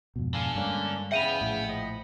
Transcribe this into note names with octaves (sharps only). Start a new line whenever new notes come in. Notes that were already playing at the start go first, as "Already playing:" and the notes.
F2 G#2 B2
D3 F5 G#5
G2 G#3 A#3 C#4 D4
E2 C#3 E5 F#5 G5 B5 D#7 F7
A#1 A2
F3 D#5